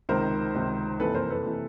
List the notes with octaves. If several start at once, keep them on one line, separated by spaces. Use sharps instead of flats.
C#2 C3 D#3 A#4 C5
C#2 C3 D#3
F#1 F2 C3 E3 A4 B4
A#4 C5
A4 B4
C3 E3